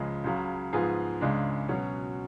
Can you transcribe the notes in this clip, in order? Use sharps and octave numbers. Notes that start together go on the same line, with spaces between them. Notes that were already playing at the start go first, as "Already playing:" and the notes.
Already playing: C#2 C#3 F3 G#3
C#2 C#3 F#3
G#2 F3 B3 F4 G#4
C#2 C#3 G#3 D4
B2 F#3 C#4